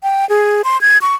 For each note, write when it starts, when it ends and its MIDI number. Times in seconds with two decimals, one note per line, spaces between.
0.03 0.28 79
0.29 0.62 68
0.64 0.80 84
0.81 0.98 92
1.02 1.15 85